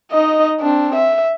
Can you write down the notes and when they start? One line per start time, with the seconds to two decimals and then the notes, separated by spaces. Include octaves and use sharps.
0.11 D#4 D#5
0.61 C4 D4
0.95 E5